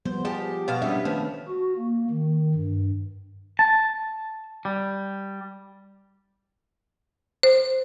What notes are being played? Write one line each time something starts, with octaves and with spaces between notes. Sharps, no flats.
F3 G3 B3 C5
F3 G4 G#4
B2 B3 F5
B1 G3 B3 C#4 D4 E5
D#2 F3 A3 B3 C#4
F#4
A#3
D#3
G2
A5
G3
C5